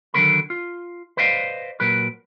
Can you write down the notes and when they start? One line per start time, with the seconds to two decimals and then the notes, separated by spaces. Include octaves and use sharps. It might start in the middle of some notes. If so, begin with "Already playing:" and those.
0.14 D3 D#3 F#3 A#3 A#4 B5
0.50 F4
1.17 B4 C5 D5 D#5 F5
1.80 A#2 F#3 A#4 B4